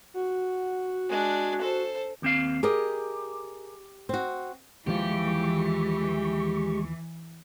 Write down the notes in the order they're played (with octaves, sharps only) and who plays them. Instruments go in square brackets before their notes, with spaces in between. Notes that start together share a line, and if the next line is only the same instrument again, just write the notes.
[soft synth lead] F#4
[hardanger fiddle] G#3 D4
A4 C5
[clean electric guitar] D#2 C4 F5
[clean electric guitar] G4 [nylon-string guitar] G#4 A#4 D#5
[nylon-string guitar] C4 F#4
[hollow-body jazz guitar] D#2 F3 F4 [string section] E3 [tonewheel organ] G#3 C#6 [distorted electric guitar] G4